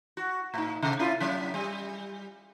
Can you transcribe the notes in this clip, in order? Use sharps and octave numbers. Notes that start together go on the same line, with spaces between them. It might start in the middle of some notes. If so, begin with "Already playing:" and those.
F#4
A2 D#4
C3
C#4 E4 F4
G2 F#3 C#4
G3